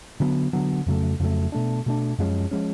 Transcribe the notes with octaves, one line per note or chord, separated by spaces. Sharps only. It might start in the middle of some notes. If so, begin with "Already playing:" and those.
D3 F#3 B3
D3 F#3 B3
F2 C#3 F#3 A3
F2 C#3 F#3 A3
B2 A3 D4
B2 A3 D4
F#2 F3 G#3 C#4
F3 G#3 C#4